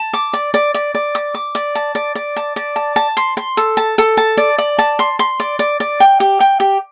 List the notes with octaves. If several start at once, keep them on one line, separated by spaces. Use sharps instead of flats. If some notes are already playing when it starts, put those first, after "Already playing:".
Already playing: A5
D6
D5
D5
D5
D5
D6
D6
D5
A5
D5
D5
A5
D5
A5
A5
C6
C6
A4
A5
A4
A5
D5
D5
A5
C6
C6
D5
D5
D5
G5
G4
G5
G4